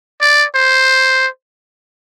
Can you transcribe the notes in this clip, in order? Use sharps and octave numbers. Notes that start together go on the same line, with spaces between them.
D5
C5